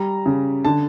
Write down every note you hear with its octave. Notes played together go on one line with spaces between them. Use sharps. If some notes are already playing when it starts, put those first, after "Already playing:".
Already playing: G3 A#5
C#3
D3 A5